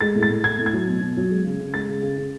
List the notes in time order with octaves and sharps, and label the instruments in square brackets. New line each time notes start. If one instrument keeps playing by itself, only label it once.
[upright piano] G#3 A6
A2
A6
A2
A2 G#6
A2
G#6
F#3
B2
B2
F#3
G#3
C#3
C#3
G#3 A6
C#3
C#3
C#3